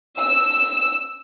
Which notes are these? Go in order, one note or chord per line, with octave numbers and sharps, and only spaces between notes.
E6